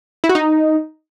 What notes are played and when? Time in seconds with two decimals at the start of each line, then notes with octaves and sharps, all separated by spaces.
0.24 E4
0.29 F#4
0.35 D#4